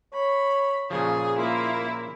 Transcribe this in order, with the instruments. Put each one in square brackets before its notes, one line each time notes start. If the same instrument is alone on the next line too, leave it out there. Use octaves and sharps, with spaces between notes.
[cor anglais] C#5 [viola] B5
[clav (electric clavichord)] A#2 C#3 F3 [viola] G#4
[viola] A#3 E4 [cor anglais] F4